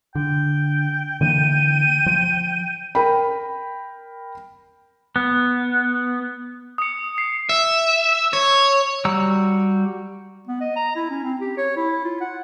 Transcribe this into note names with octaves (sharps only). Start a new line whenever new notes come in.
D3 G5
D3 E3 A#3 D#7
F3
A#4 G5 B5
B3
D#6 C#7
C7
E5
C#5
G3 F#4 A#5 E6
B3
D#5
A#5
E4
C#4
C4
G4
C#5
E4
F4
F#5